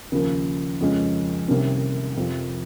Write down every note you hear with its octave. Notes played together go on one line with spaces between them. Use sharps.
D#2 C#3 F3 A#3
F2 C#3 F3 G#3 C#4
C2 C3 D#3 A#3 C#4
F2 C3 F3